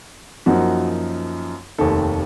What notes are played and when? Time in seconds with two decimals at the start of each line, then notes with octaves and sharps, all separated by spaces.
0.46 F#2 F3 A#3 D#4 F#4
1.78 F1 D#2 D#3 A4